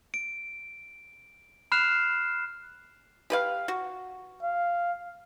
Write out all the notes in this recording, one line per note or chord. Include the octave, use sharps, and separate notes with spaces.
D7
B5 F6 F#6 C7 E7
G4 B4 F5
F#4
F5